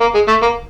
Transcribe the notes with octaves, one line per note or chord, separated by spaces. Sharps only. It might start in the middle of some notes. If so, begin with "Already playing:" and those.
A#3
G#3
A3
A#3